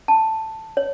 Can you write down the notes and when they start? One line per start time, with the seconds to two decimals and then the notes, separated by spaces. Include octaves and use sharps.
0.08 A5
0.77 C#5